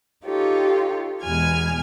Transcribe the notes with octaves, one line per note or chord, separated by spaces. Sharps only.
D#4 F4 G4 A4 C#5
E2 B2 G#3 G#5 F6 G#6